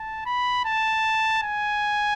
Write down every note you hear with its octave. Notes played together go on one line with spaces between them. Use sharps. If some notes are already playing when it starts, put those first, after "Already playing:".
Already playing: A5
B5
A5
G#5